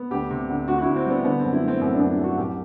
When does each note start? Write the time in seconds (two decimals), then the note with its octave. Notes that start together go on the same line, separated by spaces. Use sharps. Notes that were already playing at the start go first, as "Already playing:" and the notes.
Already playing: B3
0.11 D2 G4
0.30 C3
0.49 D2
0.68 D2 F#4
0.78 F#4
0.82 E4
0.87 D2
0.96 C4
1.06 G3 B3
1.24 D3 B3
1.39 F#2 C4
1.53 E4
1.63 A3 C4
1.81 F#2 C4
1.95 F#2 D4
2.09 E4
2.19 F#2 F#4
2.37 C2 G4